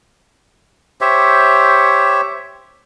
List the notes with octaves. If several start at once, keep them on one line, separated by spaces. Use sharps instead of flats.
G4 C5 C#5 E5